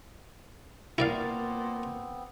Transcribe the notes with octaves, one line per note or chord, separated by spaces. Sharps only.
A#2 B3 C4 E4 A#4 D5 F5 A6